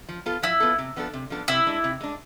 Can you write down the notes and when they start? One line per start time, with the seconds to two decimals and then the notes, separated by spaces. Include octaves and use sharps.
0.09 F3
0.26 B3 F4 A4
0.42 F3 E4
0.60 B3 F4 A4
0.78 C3
0.96 F3 B3 D4 A4
1.13 C3
1.30 F3 B3 D4 A4
1.48 C3 E4
1.66 G#3 D4
1.84 C3
2.01 G#3 D4